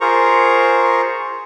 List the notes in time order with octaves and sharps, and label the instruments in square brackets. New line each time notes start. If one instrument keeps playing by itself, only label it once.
[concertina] F4 G#4 A#4 C5 A#5 C#6